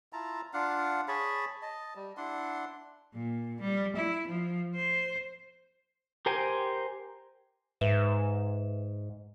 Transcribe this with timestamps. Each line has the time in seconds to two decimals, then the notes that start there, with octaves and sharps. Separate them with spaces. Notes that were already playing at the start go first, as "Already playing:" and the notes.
0.13 E4 F4 A5 A#5
0.53 D4 F4 F5 F#5
1.08 G#4 C#5 A5 B5
1.62 D#5 A5
1.95 G3
2.17 D4 E4 F#5 C6
3.14 A#2
3.61 G3
3.96 E4
4.27 F3
4.76 C5
6.26 G4 A#4 C5 G5 G#5
7.81 G#2 B4 E5 E7